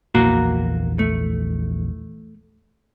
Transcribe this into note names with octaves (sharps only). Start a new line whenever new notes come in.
A#1 E2 E3 A#3 F#4 A#4
A3